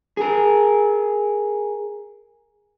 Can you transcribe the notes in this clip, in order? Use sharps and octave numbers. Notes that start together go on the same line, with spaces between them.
G#4 A#4